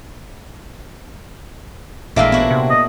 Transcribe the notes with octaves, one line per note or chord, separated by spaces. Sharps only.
A1 A#2 G#3 A#3 D4 E5 F5
B3 E4 F#4
C3
D#5